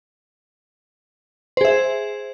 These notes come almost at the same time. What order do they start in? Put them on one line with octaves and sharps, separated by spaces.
C5 G#4 E5